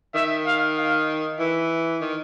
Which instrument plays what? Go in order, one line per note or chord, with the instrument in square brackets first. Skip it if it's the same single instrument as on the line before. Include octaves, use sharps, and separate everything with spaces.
[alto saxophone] D#3 [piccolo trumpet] E5
[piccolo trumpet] F5
F5
[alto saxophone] E3 [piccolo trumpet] E5
[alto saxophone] D#3